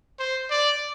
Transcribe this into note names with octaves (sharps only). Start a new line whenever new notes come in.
C5
D5